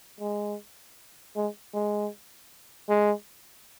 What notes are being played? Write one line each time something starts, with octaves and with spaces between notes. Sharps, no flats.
G#3
G#3
G#3
G#3